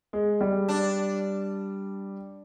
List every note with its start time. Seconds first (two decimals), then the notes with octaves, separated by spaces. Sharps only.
0.13 G#3
0.41 G3
0.68 D4